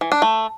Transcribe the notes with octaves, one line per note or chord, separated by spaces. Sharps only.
E3
D4
A3